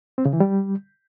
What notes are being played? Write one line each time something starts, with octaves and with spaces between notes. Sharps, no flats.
C4
C#3
E3
G3